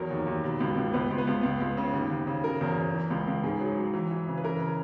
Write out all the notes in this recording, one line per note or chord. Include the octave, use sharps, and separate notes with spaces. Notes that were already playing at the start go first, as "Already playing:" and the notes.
Already playing: E2 F#3 A#4
D#2
D#2
B2
C#2
C#2
C#2 B3 B4
C#2
B3 B4
C#2
C#2
C#2
C#3
D#2
D#2
C#3
F#3 A#4
E2
E2
E3
C#2
C#2
G#2 G#4
F#3
F#3
E3
E3
C#3
B4
E3 A#4
C#3